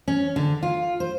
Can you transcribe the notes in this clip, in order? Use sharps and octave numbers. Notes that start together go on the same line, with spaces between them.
C#4
D3
F4
C5